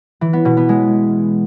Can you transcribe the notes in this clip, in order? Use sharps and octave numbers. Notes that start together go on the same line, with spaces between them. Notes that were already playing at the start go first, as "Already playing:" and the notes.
E3
B3
B2
B3
G#3